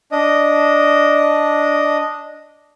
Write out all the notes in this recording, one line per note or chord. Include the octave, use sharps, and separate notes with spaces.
D4 D#5